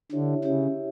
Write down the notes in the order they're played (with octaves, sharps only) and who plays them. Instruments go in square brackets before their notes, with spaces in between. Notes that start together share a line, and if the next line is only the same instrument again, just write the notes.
[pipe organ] D3 [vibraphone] E4 G4 C#5 E5
[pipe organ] C#3 [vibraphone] E4 G4 C#5 E5